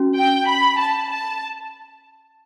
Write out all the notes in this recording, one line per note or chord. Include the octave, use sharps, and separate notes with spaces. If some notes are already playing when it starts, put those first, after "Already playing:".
Already playing: C#4 F#4
G5
B5
A5
A5